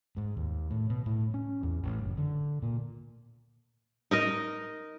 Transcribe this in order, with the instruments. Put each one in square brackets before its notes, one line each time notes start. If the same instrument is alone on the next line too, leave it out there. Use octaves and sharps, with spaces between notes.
[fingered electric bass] G#2
D#2
A2
B2
A2
C#4
E2
A1
F#1
D3
A#2
[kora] D#4 A#4 D#5